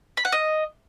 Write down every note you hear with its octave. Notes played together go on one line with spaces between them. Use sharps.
B5
F#5
D#5